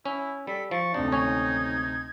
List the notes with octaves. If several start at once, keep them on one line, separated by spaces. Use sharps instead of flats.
C#4 E4
G3 A4 B6
F3 C#6 A6
D2 C3 C4 D4 D#4
G#1 C#4 C#5 G#6